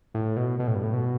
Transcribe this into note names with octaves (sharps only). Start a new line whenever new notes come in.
A2
B2
B2
A2
G2
A2
B2